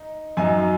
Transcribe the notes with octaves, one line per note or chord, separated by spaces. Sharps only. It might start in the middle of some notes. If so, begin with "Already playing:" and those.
Already playing: D#4
F#2 F#3 D#4 G#5